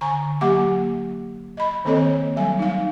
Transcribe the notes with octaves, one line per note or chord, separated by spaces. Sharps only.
D3 G#5 A#5 C#6
F#3 A#3 G4 F#5 D6
D#5 B5
D#3 A#3 C4 A4 C#5 D#5
F#3 G3 G#5
D#4 F5